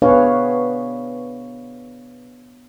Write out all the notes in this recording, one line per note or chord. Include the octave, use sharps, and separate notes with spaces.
B3 D4 G#4 B4 C#5 F5